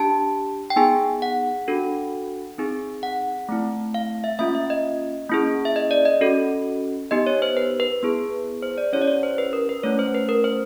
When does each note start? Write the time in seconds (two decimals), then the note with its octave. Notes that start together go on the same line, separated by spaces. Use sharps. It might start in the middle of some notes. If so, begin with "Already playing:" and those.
Already playing: D4 G4 A5
0.70 G5
0.76 B3 D#4 G#4 G#5
1.22 F#5
1.68 D4 F#4 A4
2.58 C4 D#4 G#4
3.03 F#5
3.49 A3 C4 E4
3.94 F5
4.24 E5
4.39 A#3 C#4 F4 E5
4.55 E5
4.70 D#5
5.30 A#3 C#4 E4 G#4
5.65 E5
5.76 D#5
5.91 D5
6.05 D#5
6.21 C#4 F#4 A4
7.11 B3 D#4 G4 D#5
7.26 C#5
7.42 C5
7.57 B4
7.80 B4
8.03 B3 E4 G#4
8.63 C5
8.78 D5
8.93 C#4 E4 G4 C#5
9.02 D5
9.07 C#5
9.23 C5
9.38 B4
9.53 A#4
9.69 B4
9.83 A3 C#4 E4 C#5
9.99 C5
10.14 B4
10.29 A#4
10.44 C5